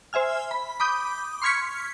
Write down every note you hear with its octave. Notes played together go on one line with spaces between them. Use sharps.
C5 E5 G#5 F6
B5
B5 D6 D#6 G6
C6 C#6 F6 G#6 B6 C#7